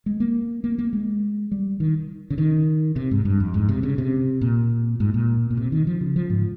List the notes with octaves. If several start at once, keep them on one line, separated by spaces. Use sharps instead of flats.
G#3
A#3
A#3
A#3
G#3
G3
D#3
C#3
D#3
C3
G#2
G2
F2
G#2
C3
C#3
C3
A#2
G#2
A#2
A#2
C3
D#3
F3
C#3
F3
G#2